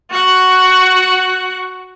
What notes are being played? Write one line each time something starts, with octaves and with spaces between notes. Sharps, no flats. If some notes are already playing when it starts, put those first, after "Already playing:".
F#4 F#5